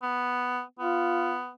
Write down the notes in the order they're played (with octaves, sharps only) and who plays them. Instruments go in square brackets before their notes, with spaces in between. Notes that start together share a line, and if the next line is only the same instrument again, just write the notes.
[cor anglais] B3
[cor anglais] B3 [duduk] F4